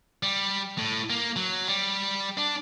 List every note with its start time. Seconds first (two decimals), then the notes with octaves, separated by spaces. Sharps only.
0.23 G3
0.78 A2
1.10 A#3
1.36 F#3
1.68 G3
2.38 D4